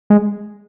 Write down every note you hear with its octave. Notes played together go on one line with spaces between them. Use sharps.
G#3